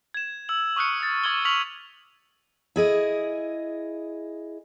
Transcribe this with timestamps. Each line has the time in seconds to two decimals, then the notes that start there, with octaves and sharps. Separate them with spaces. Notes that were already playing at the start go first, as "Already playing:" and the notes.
0.14 G#6 E7
0.49 E6 F#7
0.76 C#6 D#6 F6 F#6 C#7
1.01 D#6 A6
1.24 C#6 D6 G#6 F#7 G7
1.45 C#6 F6 B6 F7 F#7
2.76 E4 G#4 D#5